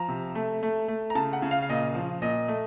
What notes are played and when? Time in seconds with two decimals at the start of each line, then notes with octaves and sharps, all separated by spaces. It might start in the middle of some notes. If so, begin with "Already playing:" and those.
Already playing: F3 A#5
0.08 C3
0.35 A3
0.63 A3
0.88 A3
1.10 A#5
1.15 C#3 A5
1.33 F#5
1.42 C#3
1.51 F5
1.62 F5
1.69 A#2 D#5
1.95 F3
2.22 A#2 D#5
2.48 A3